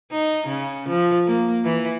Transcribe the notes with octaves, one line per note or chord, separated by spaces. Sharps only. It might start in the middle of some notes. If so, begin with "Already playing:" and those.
D#4
C#3
F3
A#3
E3